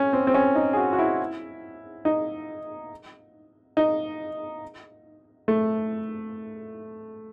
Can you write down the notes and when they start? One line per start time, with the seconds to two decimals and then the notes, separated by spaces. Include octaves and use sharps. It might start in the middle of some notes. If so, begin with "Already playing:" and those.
Already playing: C#4
0.13 C4
0.27 C4
0.34 C#4
0.55 D#4
0.73 G#4
0.77 F#4
0.93 F#4
0.99 E4
2.05 D#4
3.77 D#4
5.48 A3